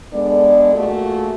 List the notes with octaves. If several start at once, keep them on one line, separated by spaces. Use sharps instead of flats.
G#3 B3 D4 A4 D5
A3 A#3 F4 F#4 G#4 A4